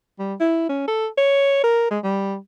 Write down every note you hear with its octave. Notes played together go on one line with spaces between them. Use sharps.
G3
E4
C#4
A4
C#5
A#4
G#3
G3